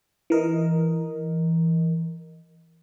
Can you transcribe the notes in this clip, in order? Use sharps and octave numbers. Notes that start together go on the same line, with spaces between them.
E3 A#4 D#5